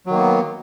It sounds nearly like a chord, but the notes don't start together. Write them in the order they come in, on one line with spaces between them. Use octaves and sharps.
F#3 D#3 A#3 B3